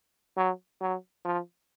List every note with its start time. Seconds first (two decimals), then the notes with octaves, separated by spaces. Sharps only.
0.37 F#3
0.81 F#3
1.25 F3